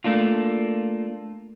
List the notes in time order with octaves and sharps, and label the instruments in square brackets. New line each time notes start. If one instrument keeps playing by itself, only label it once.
[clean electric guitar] A3 A#3 D4 F4